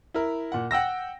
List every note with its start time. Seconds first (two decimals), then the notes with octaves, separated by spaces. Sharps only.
0.14 E4 A#4
0.52 A#2 F#5
0.71 F#5 G5 E6 A#6